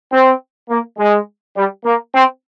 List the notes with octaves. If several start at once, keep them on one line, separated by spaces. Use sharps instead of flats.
C4
A#3
G#3
G3
A#3
C4